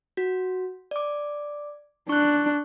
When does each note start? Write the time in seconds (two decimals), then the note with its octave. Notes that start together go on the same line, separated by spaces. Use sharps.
0.17 F#4
0.91 D5 D6
2.09 D4 C#6 F#6